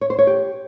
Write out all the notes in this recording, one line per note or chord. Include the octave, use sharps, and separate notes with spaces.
C#5
C5
C#5
G4